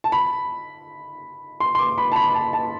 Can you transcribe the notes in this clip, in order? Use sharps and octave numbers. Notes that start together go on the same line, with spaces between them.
A5
B5
C6
C6
D6
B5
A5
B5
A5
A5